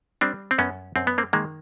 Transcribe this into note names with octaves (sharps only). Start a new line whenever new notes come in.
G3 C4 D4
C4
F#2 B3 C#4
F#2 C4
B3
A#3 C4
D#3 G#3 A#3